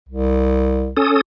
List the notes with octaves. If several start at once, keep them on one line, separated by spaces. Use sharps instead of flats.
C2
C#4 A4 D#6